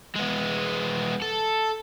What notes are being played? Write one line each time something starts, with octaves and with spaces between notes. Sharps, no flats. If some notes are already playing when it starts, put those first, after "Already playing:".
G#3 B3
A4